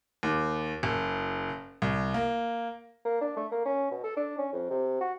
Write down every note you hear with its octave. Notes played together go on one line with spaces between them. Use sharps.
D#2
F#1
C2
A#3
A#3
D4
A3
A#3
C#4
B2
A4
D4
C#4
F2
C3
F#4